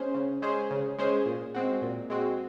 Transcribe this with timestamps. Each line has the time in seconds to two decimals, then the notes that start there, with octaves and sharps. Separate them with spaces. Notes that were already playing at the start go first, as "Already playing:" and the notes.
Already playing: G#3 C#4 G#4 C5
0.14 C#3
0.42 G#3 C#4 G#4 C5
0.71 C#3
0.98 G#3 C#4 G#4 C5
1.26 A#2
1.54 G#3 C4 F#4
1.82 A#2
2.10 G#3 C4 F#4